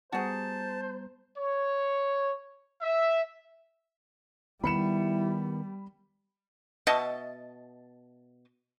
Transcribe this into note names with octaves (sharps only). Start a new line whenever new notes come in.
G3 B3 F#4 G#4 C5 A5 A#5
C#5
E5
D#3 G3 B3 E4 B5 C#7 E7
B2 D#5 E5 A5